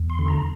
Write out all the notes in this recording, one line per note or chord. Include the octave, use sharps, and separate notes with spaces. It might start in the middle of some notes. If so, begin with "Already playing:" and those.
Already playing: E2
C6
D3
A#5